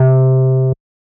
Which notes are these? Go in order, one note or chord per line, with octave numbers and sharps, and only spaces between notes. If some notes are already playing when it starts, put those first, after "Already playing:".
Already playing: C3